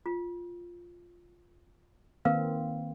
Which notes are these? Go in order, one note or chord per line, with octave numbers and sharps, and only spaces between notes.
F4
D#3 A#3 C4 A#4 B4 F5